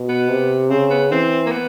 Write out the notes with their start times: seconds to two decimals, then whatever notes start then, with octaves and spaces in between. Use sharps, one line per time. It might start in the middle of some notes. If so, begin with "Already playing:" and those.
Already playing: B2
0.09 B3
0.30 C3
0.70 C#3 C4
0.90 B3
1.12 E3 C4
1.46 A#3
1.52 B3